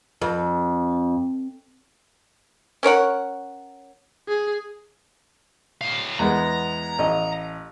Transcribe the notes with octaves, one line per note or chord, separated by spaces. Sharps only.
F2
C#4 A#4 C#5 F#5
G#4
A2 F5
E2 G#3 B3 A#5
A1 D#5